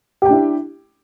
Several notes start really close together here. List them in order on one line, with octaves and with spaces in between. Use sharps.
G4 G5 D4 E4